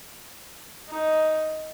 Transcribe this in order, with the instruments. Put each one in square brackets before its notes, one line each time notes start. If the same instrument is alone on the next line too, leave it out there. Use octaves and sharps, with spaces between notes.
[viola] D#4